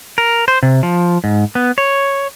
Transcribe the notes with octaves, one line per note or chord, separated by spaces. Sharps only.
A#4
C5
C3
F3
G#2
B3
C#5